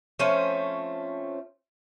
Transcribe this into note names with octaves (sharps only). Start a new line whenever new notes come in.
F3 A3 C4 C#4